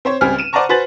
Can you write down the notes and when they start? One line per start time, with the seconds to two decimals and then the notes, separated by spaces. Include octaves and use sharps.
0.05 C4 C5 C#5
0.21 C#2 G3 C4 G#4 F6
0.38 D#7 E7
0.53 C5 D5 F#5 A5 A#5 C#6
0.69 F#4 B4 C5 G#5 A6 F#7